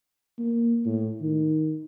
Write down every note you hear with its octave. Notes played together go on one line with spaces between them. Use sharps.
A#3
A2
D#3